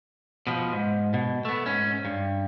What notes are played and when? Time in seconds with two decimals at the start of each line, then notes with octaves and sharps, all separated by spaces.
0.47 B2 F3
0.72 G#2
1.14 B2
1.45 A3 B3
1.66 G#2 C#4
2.05 G2